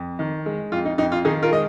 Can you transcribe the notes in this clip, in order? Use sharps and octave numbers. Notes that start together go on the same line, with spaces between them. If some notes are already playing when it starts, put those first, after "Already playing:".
Already playing: F2
D#3
G#3
F2 F4
D#4
F2 D#4
F4
D#3 D#4 G#4
F4 A#4
G#3 D#5